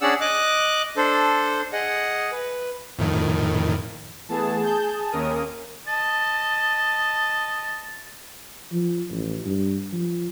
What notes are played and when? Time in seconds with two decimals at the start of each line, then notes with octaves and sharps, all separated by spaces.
0.01 C#4 D4 G#4 D5 F#5 E6
0.21 D#5 D6 F#6
0.97 D4 A4 C5
1.73 G#4 D#5 F#5
2.32 B4
2.99 F2 A2 D#3
4.29 E3 A3 B3 G#4 A5
4.63 G6
5.12 D#2 C#4 A#4 D#6
5.87 D#5 A5 A6
8.72 F3
9.11 A1
9.45 G2
9.93 F3